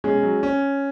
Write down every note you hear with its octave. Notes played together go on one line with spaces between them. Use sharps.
B2 G#3 C#4
F#3
C#4